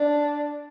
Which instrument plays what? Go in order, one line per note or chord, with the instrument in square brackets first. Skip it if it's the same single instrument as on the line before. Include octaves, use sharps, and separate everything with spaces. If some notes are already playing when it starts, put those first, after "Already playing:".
Already playing: [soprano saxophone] D4